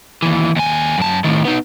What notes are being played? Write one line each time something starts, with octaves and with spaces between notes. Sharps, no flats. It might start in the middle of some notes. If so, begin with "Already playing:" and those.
D#2 E3
D#2 G#5
F#2 A5
A2 D#3
B3 D#4